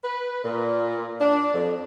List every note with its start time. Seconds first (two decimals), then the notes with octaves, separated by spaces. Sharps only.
0.03 B4
0.43 A#2
1.21 D4
1.54 F2